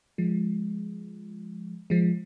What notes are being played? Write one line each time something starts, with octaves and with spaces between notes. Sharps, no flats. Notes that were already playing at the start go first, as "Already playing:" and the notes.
F3 G#3
F3 G#3